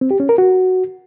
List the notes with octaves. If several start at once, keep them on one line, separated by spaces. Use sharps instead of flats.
C4
G4
C#4
A#4
F#4